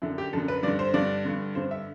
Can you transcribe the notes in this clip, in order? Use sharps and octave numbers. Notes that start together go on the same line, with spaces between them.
F#2 D3 E4
G4
F#2 D3 A4
B4
G2 D3 D5
C5
G2 D3 D5
G2 D3
G2 D3 C5
E5